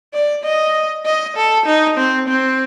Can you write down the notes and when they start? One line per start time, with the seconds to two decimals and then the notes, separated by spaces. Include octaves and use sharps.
0.14 D5
0.44 D#5
1.05 D#5
1.36 A4
1.66 D#4
1.97 C4
2.28 C4